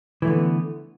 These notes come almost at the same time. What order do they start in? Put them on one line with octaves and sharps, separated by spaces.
E3 A3 D3 B3